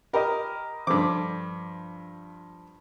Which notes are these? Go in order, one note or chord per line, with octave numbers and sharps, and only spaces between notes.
G4 A#4 D#5 B5
G2 F3 A4 C5 D6